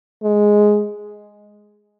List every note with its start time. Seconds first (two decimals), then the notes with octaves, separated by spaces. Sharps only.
0.23 G#3